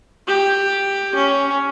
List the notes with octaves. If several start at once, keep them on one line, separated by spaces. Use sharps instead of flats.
G4
C#4